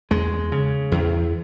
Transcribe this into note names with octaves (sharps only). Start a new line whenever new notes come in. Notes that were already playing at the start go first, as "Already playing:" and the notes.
E2 G#3
C#3
E2